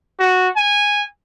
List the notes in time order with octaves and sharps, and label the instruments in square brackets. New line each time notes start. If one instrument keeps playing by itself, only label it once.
[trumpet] F#4
G#5